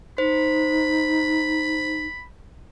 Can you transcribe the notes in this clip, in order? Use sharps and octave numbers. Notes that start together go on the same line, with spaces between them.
D#4 C5 B5